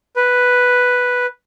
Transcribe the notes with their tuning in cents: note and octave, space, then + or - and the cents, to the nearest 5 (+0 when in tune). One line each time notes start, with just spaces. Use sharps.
B4 +0